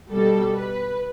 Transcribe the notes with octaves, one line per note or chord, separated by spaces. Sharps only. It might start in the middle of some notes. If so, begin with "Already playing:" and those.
B2 G3 A4
B4